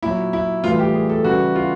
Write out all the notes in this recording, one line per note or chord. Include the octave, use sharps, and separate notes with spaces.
A#2 F#3 E4
E4
A2 E3 G3 F4
G4
G#4
A4
C#3 E3 G3 F#4
F4